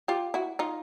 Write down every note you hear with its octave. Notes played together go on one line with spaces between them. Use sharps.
F4 G4
E4 F#4
D#4 F4